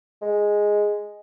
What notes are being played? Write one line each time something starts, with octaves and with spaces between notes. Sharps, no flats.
G#3